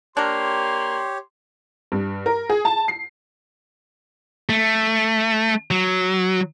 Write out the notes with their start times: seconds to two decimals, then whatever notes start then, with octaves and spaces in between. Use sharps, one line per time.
0.17 A#3 D4 G4 A#4 C#5 C6
1.92 G2
2.26 A#4
2.50 G#4
2.65 A5
2.88 C7
4.49 A3
5.71 F#3